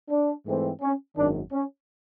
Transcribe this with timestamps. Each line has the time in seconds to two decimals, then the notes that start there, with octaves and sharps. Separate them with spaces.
0.10 D4
0.46 G#2 E3 A3 C4
0.82 C#4
1.17 G#1 F#2 D#3 D4
1.53 C#4